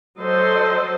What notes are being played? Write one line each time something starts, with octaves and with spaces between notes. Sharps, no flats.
F#3 A4 C5 D#5